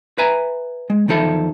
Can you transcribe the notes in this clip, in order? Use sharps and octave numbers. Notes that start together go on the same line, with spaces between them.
B4 E5 G#5 A#5
G#3
E2 D#3 F3 A4 E5 B5